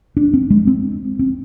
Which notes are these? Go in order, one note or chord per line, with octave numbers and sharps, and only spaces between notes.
D4
C4
G#3
C4
C4